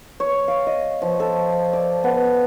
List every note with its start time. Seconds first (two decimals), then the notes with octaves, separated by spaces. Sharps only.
0.20 C#5
0.48 F5
0.67 D#5
1.02 F3
1.20 A4
1.73 D5
2.04 B3